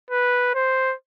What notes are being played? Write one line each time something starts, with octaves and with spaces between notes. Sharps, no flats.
B4
C5